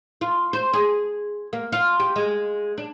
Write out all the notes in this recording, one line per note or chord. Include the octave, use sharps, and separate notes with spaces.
F4
C5
G#4
A#3
F4
G4
G#3
D4